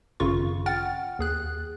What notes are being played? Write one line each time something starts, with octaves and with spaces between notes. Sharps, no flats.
G#1 F#2 C#3 F4 C#6
F#5 G5 F6 A6
D#2 G#4 F#6